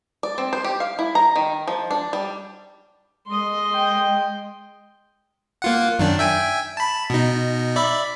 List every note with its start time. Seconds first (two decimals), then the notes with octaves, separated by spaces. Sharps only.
0.23 D5
0.38 C4
0.53 C5
0.64 G4
0.80 F5
0.99 E4
1.15 A#5
1.36 D#3
1.68 F3
1.91 D4
2.13 G3
3.28 G#3 D#5 C6
3.73 G5
5.62 A#3 F4 F#5
5.99 F#2 D#3 D4
6.19 E5 G5 G#5
6.77 A5 B5
7.10 B2 D#4
7.76 D5 E5 B5